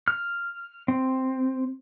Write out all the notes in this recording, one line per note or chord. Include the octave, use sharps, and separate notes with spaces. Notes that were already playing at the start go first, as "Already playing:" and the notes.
F6
C4